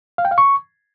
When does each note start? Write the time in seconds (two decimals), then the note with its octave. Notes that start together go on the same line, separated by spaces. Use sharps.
0.18 F5
0.25 G5
0.31 F5
0.38 C#6